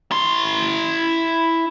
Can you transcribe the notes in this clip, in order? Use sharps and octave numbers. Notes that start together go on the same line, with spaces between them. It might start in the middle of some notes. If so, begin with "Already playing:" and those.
E4 C6